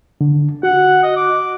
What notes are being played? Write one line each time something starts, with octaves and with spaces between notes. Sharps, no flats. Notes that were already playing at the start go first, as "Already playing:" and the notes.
D3
F#4 F#5
D#5
D6